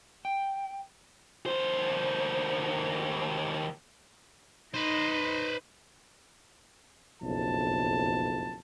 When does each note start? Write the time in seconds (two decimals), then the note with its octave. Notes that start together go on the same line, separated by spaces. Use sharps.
0.25 G5
1.46 D#2 C5
4.74 D#4 B4 C5
7.21 F#1 B1 F2 A5